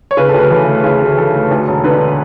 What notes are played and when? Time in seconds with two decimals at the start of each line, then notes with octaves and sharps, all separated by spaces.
0.11 C#5
0.17 C#3 B4
0.29 A4
0.34 D2
0.39 B4
0.50 E3 A4
0.68 A3
0.84 C#3
1.01 D2
1.17 E3 A4
1.34 A3
1.51 D2
1.68 E1
1.84 D3 B4